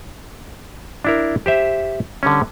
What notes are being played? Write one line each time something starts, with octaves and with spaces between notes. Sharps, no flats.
D4 E4 A#4
G4 C5 E5
D3 G3 C#4